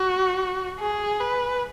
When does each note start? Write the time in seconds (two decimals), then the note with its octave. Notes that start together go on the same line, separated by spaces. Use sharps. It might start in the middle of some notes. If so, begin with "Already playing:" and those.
Already playing: F#4
0.80 G#4
1.20 B4